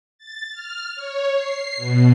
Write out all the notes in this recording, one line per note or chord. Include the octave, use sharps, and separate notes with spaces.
A6
F6
C#5
C7
B2